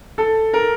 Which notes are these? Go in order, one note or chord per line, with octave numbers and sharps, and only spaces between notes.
A4
A#4